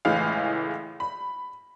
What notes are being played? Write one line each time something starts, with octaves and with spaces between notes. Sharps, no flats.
C#2 A2 E3 G#3 F5
B5